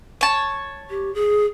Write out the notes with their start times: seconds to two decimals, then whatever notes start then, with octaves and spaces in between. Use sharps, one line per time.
0.21 C#5 A5
0.90 G4
1.14 G#4